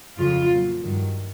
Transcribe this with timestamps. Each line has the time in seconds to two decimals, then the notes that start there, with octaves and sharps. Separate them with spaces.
0.18 F2 C#3 F#3 F4
0.50 A#2 F#3
0.82 G2 D#3 F#3